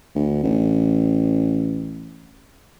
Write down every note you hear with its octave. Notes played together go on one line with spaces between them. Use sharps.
D2
A1